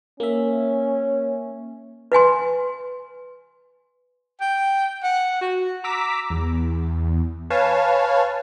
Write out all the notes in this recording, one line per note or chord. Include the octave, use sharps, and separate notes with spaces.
A#3 C#4 E5
B4 F#5 G#5 C6
G5
F#5
F#4
A#5 D6 E6 B6
E2
B4 C#5 F5 G#5 A5